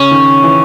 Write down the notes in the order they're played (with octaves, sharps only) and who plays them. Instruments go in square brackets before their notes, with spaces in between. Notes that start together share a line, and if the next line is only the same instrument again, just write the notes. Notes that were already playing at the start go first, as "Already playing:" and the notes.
Already playing: [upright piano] C#3 [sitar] C#4
[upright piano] D#3
E3